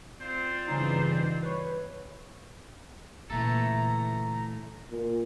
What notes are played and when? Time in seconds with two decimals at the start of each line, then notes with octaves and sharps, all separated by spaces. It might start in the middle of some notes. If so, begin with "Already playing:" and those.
0.21 C4 F4 C5 D5
0.67 G2 C#3 E3 G3 D#4
1.42 B4 C#5
3.30 A#2 C#3 E3 A3 A4 A#5
4.91 A#2